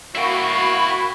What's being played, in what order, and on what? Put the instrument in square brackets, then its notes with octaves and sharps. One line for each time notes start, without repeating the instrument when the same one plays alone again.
[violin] A#3 B5 [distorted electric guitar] E4 G5 [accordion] F#4